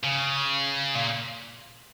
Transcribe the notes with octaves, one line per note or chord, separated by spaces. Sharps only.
C#3
A#2